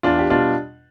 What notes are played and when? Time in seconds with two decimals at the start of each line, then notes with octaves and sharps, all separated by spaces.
0.03 E2 D4 F4
0.19 G4
0.30 B2 G3 D4 F4